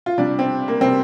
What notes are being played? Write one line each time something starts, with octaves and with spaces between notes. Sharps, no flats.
F4
C3 G3 D4
C4
A#3
C3 G3 C4